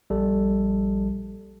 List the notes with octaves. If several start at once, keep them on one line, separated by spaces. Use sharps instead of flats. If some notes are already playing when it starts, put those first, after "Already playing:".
A#1 G3 A4